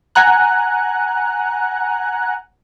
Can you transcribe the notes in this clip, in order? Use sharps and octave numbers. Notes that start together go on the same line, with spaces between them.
F#5 G#5 A#5 F#6